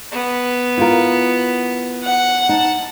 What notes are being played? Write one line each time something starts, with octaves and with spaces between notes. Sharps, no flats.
B3
E4 F4 A#4
F#5
D#4 A5